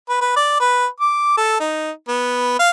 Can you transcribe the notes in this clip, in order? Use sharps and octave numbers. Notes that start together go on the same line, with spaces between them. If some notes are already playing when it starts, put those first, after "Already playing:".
B4
B4
D5
B4
D6
A4
D#4
B3
F5